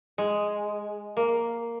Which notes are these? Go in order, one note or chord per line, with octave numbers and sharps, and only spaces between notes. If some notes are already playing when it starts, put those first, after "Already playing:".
G#3
A#3